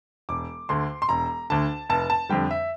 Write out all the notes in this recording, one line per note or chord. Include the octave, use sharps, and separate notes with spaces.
E1 D6
D2 D3 C6
C6
E1 A#5
D2 D3 A5
F1 A5
A5
F2 D3 G3 G5
E5